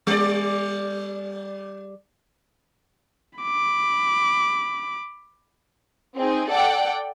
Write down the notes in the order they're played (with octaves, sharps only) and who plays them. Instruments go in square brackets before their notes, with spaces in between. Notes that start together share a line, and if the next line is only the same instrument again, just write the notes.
[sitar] G3 D5
[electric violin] B5 D6
[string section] C4 D#4 G#4
A4 D5 F#5 G5